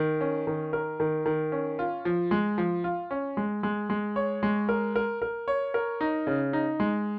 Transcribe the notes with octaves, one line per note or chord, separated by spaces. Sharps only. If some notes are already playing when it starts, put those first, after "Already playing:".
Already playing: D#3
C#4
D#3
A#4
D#3
D#3
C#4
F4
F3
G#3
F3
F4
C#4
G#3
G#3
G#3
C#5
G#3
A#4
A#4
A#4
C#5
A#4
D#4
C#3
D#4
G#3